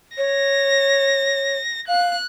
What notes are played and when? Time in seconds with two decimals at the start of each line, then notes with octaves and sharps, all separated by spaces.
0.18 C#5 A#6
1.88 F5 F#6